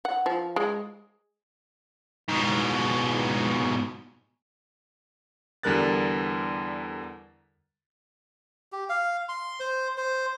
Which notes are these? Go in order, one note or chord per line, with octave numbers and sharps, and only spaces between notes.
F#5
F3
G#3
G#2 B2
E2 D3 G3 A#4 F#6 A6
G4
F5
C6
C5
C5